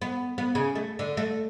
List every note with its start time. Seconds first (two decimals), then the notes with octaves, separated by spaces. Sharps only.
0.02 B3
0.38 B3
0.55 C#3
0.75 A3
0.99 D3
1.17 A3